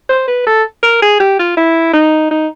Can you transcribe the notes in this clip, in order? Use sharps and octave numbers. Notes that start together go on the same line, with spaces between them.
C5
B4
A4
A#4
G#4
G4
F4
E4
D#4
D#4